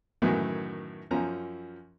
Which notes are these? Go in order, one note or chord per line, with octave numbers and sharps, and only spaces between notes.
F#2 A2 D#3 E3 F#3
F#2 F3 C#4 A#5